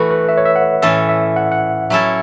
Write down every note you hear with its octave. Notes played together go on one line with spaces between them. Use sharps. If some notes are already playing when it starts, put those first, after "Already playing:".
Already playing: E3 A3 F#4 A4 B4
B4
E5
C#5
E5
F#5
A2 E3 C#4 A4 E5
E5
F#5
F#5
F#3 C#4 E4 A4 E5